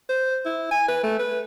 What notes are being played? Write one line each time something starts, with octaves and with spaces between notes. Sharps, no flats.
C5
E4
G#5
B4
A3
B4